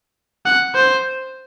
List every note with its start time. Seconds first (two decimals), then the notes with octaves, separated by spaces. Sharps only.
0.46 F#5
0.75 C5